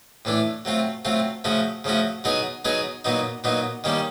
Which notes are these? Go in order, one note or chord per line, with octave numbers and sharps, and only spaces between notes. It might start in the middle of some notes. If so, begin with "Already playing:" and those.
A2 E3 A3 D4
F#3 A3 C4 F4
F#3 A3 C4 F4
C#3 F3 A3 C#4 F#4
C#3 F3 A3 C#4 F#4
F#3 B3 D#4 G#4 C#5
F#3 B3 D#4 G#4 C#5
A#2 F#3 B3 D#4
A#2 F#3 B3 D#4
D#3 G3 A#3 C#4